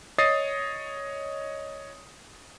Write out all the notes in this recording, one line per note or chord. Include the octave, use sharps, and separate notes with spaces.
C#5 D#5 D#6 A6 C7